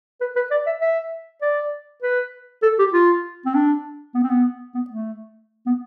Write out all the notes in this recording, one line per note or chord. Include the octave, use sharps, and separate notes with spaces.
B4
B4
D5
E5
E5
D5
B4
A4
G4
F4
C4
D4
B3
C4
B3
B3
A3
B3